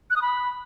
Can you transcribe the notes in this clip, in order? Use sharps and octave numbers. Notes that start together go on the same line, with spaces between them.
F#6
D#6
B5